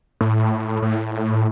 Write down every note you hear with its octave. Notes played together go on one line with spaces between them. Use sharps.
A2
A2